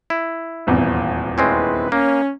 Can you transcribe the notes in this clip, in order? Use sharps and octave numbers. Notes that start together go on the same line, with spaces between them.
E4
D#1 G#1 E2
D#3 G#3 C4 C#4 E4 B4
A#3 C#4